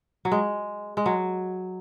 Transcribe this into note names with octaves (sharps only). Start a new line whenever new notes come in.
F#3
G#3
G#3
F#3